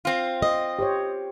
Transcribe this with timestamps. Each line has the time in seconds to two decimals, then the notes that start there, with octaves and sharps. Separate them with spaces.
0.05 C4 F4
0.42 D#5
0.79 G4 C5 C#5